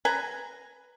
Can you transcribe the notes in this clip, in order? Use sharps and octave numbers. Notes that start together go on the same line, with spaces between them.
B4 G#5 A#5